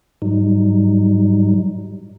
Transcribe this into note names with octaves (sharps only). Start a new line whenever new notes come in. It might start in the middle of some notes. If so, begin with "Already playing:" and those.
G#2 F#3 G3 D#4